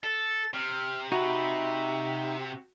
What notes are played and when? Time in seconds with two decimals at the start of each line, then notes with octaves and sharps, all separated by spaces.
0.04 A4 A6
0.54 C3 F6
1.12 D#4 F#4 E5 A#5 B5